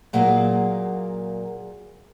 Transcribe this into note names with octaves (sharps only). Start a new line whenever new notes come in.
A#2 F#3 A#3 G#4 F5